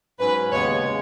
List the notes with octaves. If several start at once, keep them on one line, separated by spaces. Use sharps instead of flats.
G#2 F#3 C#4 B4
D#2 C#3 G#3 B3 C#5
C#3 G#3